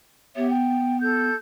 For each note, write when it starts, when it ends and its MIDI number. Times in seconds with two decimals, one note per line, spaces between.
0.36 1.30 59
0.36 0.48 67
0.36 0.48 73
0.36 0.48 76
0.50 0.99 79
1.02 1.34 69
1.02 1.34 91